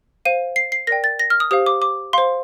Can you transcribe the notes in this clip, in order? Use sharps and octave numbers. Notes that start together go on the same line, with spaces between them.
C5 F5 D#7
C7
C7
A#4 D5 G5 A#6
A6
A#6
F6
D#6
G4 C5 F5 D#6
D6
D6
C5 F5 C6